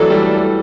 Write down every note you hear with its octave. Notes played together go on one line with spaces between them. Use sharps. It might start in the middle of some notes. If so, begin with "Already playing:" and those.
Already playing: E3 F#3 A3 D4 A4
G3